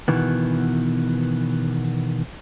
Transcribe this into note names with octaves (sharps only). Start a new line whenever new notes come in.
B2 D#3 E3 B3